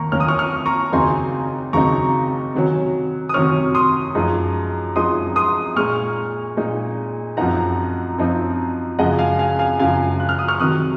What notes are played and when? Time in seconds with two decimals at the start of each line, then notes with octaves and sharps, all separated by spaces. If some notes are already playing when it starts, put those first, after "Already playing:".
Already playing: D#2 D#3 A#3 A#5 C#6
0.12 D#2 D#3 A#3 C#4 F6
0.20 D#6
0.28 C#6 F6
0.39 C#6 F6
0.66 A#5 C#6
0.92 D#2 C#3 F#3 C4 D#4 G#5 C6
1.73 D#2 C#3 F#3 C4 D#4 A#5 C#6
2.54 C3 D#3 F#3 C#4
3.29 D#6
3.34 C3 D#3 F#3 C#4 C#6 F6
3.75 C6 D#6
4.15 F#2 F3 G#3 D#4
4.96 F#2 F3 G#3 D#4 C6 D#6
5.36 C6 D#6
5.76 A#2 G#3 D#4 C#6 F6
6.57 A#2 G#3 D#4
7.37 F#2 F3 C4 D#4 F#5 A#5
8.18 F#2 F3 C4 D#4
8.99 F#2 C#3 F3 G#3 D#5 F#5
9.19 F5 G#5
9.39 F5 G#5
9.59 F5 G#5
9.79 F#2 C#3 F3 G#3 F5 G#5
10.20 F#6
10.29 F6
10.39 D#6
10.48 C#6 F6
10.60 C3 D#3 F#3 D#6 F#6